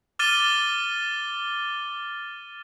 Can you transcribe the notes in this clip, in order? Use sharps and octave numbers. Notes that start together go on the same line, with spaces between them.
D6 F6 A6 D#7 G7